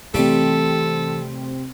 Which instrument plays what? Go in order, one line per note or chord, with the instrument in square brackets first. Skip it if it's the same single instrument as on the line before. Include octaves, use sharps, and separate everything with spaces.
[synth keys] C3 C4 [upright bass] E3 [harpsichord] G3 A3 D5 [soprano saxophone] A4